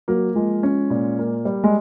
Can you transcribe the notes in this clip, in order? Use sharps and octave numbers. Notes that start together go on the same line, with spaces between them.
F#3 A#3
F3 G#3
C#4
A#2
A#3
G3
G#3